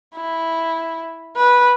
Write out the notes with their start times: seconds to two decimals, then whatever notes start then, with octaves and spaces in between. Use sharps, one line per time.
0.15 E4
1.37 B4